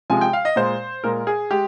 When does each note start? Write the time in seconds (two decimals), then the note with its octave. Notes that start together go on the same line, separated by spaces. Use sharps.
0.10 C3 F3 G#3 G#5
0.21 G5
0.33 F5
0.45 D#5
0.56 A#2 G#3 C5
1.04 A#2 G#3 A#4
1.27 G#4
1.51 G#3 G4